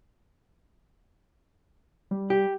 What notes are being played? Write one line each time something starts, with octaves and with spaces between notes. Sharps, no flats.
G3
G4